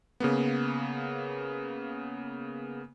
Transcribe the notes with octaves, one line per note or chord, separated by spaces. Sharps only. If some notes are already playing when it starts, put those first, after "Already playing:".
C#3 A#3 B3